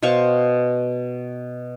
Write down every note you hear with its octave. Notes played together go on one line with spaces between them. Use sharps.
B2 C5 F5 C#6